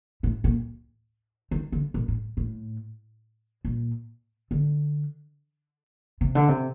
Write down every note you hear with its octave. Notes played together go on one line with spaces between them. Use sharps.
A2
A#2
D#3
D3
A#2
A2
A2
A#2
D3
C3
D3
C3